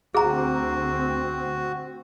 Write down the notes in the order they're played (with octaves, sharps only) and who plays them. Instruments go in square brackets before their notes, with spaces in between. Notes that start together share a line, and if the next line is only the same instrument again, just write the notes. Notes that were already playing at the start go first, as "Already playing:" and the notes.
[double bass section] D2 C4 [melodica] F#4 [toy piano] G#4 A#5